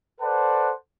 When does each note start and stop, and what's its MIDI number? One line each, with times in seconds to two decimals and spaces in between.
0.21 0.72 69
0.21 0.72 71
0.21 0.72 72
0.21 0.72 74
0.21 0.72 78
0.21 0.72 81